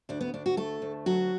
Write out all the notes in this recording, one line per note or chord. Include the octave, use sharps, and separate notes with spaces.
D2 D4
B3
D2 D4
F#4
A3 A4
D2
F#3 F#4